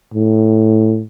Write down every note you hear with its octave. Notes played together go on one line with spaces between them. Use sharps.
A2